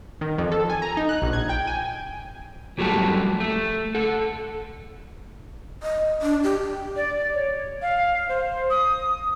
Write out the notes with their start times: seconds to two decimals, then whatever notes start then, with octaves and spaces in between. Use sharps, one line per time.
0.21 D#3
0.38 F2
0.52 A4
0.70 G#5
0.82 A#5
0.97 D#4
1.09 F#6
1.22 A#1
1.33 G#6
1.49 G5
1.67 G#5
2.78 F2 F#3 G3 A3 F#4 A5
3.40 A3
3.95 A4 F#5
5.83 D#5
6.22 D4
6.44 G4
6.96 D5
7.34 C#5
7.82 F5
8.29 C5
8.70 D#6